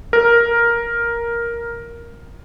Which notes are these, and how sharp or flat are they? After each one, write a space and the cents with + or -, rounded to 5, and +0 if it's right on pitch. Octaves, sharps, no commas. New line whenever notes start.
A#4 +5